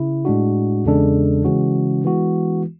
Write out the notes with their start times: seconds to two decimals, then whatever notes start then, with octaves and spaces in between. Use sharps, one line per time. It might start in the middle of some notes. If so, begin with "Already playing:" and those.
Already playing: C#3 E4
0.25 A2 G#3 D4 F#4
0.85 E2 C#3 G#3 D4 A4
1.45 C#3 E3 G#3 C#4 F#4
2.05 E3 G#3 B3 F#4